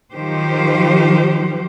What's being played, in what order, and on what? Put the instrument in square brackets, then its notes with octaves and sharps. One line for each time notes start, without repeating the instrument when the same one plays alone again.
[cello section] D#3 F3 F#3 G4 C5